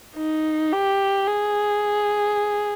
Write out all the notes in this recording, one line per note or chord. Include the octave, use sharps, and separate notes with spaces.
D#4
G4
G#4